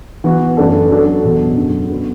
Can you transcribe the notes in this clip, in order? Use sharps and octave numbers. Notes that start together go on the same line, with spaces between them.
E3 B3 F#4
F#2 E3 A3 D4 A4
F#3 D4 A4
E2 B2 F#3
F#2 D3 F#3
D3 B3 F#4